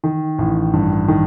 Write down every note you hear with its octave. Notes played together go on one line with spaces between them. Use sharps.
D#3
A1
G2
D#3